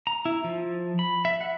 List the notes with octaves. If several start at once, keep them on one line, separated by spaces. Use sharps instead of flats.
A#5
E4
F3
B5
E5
F#5